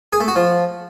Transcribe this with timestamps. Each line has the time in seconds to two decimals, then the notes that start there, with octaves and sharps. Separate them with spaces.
0.13 G#4
0.20 A3
0.28 F#4
0.36 F3